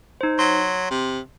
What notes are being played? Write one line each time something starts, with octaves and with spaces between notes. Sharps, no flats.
D#4 C5
F#3 C6
C3